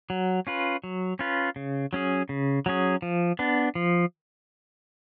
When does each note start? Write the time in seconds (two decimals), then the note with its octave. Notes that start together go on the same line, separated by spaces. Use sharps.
0.10 F#3
0.47 C#4 F4 B4
0.84 F#3
1.19 C#4 F4 B4
1.56 C#3
1.93 F#3 C#4 G#4
2.29 C#3
2.66 F#3 C#4 G#4
3.02 F3
3.39 B3 D4
3.75 F3